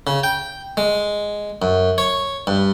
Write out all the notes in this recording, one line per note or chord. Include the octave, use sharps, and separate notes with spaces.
C#3
G5
G#3
F#2
C#5
G2